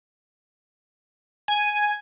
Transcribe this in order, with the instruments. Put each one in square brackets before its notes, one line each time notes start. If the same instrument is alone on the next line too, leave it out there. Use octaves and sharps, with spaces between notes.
[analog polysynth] G#5